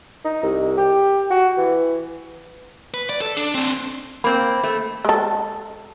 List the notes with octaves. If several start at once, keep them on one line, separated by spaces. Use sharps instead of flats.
D#4
C2
G4
F#4
E3
B4
D5
A4
D4
C4 D4
A#3 C4 B5
A3
G#3 A4